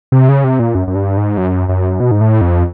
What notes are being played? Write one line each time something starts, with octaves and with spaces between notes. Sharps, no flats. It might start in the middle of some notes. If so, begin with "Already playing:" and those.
C3
C#3
C3
A#2
F#2
F#2
G2
G#2
F#2
F#2
B2
G#2
A2
F2